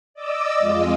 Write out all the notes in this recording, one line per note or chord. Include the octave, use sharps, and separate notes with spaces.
D5 D#5 D6 E6
F2 G#3 F4 D#5